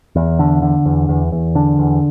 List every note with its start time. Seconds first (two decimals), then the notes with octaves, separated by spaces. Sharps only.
0.16 E2
0.39 D3
0.62 D3
0.85 E2
1.09 E2
1.32 E2
1.55 D3
1.79 E2